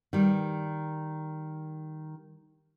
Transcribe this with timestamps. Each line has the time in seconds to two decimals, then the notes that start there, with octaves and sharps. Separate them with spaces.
0.13 D#3 G3